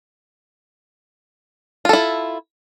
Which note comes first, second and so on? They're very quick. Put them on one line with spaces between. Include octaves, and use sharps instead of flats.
F4 A4 E4